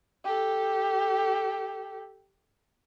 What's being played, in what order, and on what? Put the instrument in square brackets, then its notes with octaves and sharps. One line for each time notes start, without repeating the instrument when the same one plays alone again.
[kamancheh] G4 A4